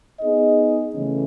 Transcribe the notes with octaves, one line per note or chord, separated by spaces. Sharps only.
B3 D#4 G#4 D#5
C#3 E3 A3 C#4